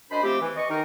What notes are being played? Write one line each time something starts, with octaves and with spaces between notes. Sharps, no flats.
F#2 D4 C5 D#5 B5
F3 A3 C4 G4
E3
D5 D#5 C#6
D#3 D#4 A#4